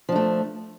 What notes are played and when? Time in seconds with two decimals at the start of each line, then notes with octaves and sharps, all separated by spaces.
0.09 F3
0.12 D4
0.16 A3